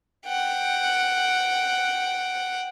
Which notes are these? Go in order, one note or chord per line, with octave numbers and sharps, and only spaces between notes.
F#5 G5